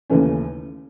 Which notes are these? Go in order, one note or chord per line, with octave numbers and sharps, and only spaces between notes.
D#2 C#3 E3 A3 C#4